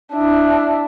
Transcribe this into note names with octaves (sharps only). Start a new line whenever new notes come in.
D4 E4